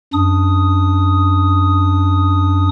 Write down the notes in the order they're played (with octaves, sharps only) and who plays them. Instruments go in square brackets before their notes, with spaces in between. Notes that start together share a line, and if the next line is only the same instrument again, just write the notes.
[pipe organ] F#2 D4 D#6